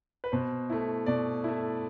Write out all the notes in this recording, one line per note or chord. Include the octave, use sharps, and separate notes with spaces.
B4
B2 C5
A3 E4
B2 D5
A3 E4